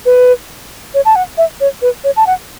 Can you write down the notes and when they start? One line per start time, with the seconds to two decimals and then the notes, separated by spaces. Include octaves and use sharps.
0.05 B4
0.94 C#5
1.05 A5
1.15 F#5
1.38 E5
1.60 C#5
1.82 B4
2.04 C#5
2.16 A5
2.26 F#5